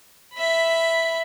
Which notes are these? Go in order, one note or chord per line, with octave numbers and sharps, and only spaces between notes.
E5 B5